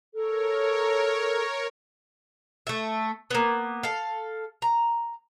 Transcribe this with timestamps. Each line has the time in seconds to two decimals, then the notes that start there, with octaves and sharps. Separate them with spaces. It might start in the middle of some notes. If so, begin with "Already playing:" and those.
0.14 A4 A#4 C#5
2.67 A3 E5
3.31 A#3 B3
3.83 A4 F5
4.62 A#5